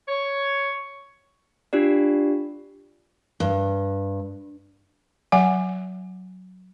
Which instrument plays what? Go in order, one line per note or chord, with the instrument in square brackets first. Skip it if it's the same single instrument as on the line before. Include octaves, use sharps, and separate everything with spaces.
[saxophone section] C#5
[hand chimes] D4 F4 G4 D5
[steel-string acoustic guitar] G2
[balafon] F#3 E5 F#5 G#5